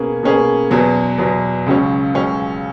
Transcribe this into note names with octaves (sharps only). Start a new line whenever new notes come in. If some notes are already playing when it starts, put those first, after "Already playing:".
Already playing: B2 A#3 C#4 G#4
B2 A#3 C#4 G#4
E2 B2 F#3
E2 B2 F#3
C#2 C#3 F#3 C#4
C#2 C#3 F#3 C#4